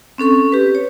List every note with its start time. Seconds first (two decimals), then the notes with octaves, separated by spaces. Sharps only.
0.18 C4 C#4 A4 C#6
0.52 G4 B4
0.75 C#5